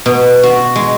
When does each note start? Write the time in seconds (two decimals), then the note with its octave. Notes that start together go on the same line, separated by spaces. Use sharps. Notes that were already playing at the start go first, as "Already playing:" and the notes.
0.06 B2
0.43 F#4
0.76 G#3